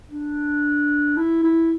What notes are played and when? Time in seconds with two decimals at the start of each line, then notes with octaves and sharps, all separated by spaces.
0.08 D4
1.17 E4
1.43 E4